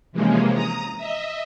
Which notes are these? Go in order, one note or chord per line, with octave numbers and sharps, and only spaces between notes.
C3 E3 F3 G#3 A#3 C#4
A#5 D#6
D#5 E5